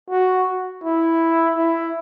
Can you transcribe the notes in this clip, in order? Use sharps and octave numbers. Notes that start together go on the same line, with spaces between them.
F#4
E4
E4